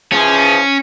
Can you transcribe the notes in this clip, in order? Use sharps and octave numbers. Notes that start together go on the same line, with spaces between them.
E3 F3 C#4 G#4